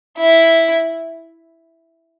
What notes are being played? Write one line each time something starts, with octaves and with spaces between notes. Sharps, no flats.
E4